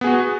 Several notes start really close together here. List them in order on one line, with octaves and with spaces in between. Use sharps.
B3 G#4 F#4